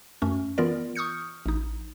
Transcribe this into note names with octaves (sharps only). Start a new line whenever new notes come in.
F#2 A3 C#4
E3 B3 F4 A#4 D5
C#6 D#6 F6 G6 C#7
A1 D#4